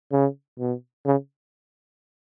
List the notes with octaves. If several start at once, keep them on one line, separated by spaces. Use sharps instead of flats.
C#3
B2
C#3